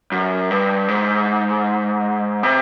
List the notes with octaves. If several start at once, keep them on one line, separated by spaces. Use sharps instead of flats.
F#2
G2
G#2
C3